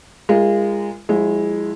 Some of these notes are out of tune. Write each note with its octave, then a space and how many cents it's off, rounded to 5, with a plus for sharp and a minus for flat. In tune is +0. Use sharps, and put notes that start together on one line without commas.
G#3 -30 F4 -30 A#4 +0
F3 +35 G#3 -10 E4 +0